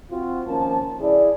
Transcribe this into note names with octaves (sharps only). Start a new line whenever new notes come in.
C4 F4 F#4
D#3 F3 A#3 C#4 A5
C#3 E4 G#4 D5